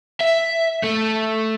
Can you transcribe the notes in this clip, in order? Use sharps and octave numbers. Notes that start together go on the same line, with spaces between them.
E5
A3